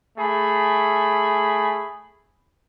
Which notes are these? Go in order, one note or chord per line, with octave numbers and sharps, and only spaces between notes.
A3 G#4 B5